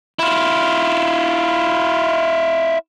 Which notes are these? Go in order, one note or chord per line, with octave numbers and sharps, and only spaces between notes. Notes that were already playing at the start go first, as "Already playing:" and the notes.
E4 F4